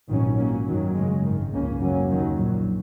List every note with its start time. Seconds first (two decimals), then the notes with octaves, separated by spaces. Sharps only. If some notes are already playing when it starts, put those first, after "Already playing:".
0.09 A#1 G#2 D#3 F#3 C#4
0.38 G#2 F#3 A#3 C#4
0.66 F#2 D#3 F#3
0.94 F#2 C#3 G#3
1.23 G#1 F#2 D#3
1.52 C#2 C#3 A#3 C#4
1.80 F#1 F#2 F#3 A#3 C#4
2.09 D#2 D#3 F#3
2.38 A#1 A#2 F#3